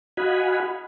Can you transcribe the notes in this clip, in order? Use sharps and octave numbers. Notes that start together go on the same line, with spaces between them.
F#4 D#5 F5 F#5 G#5 B5